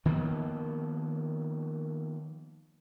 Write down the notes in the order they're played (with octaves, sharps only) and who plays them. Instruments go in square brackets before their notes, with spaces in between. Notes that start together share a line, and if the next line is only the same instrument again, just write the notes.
[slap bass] D#3 F3 A#3 B3